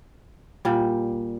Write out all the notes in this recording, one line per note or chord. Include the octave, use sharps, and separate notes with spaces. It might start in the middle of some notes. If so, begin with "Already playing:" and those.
A#2 G3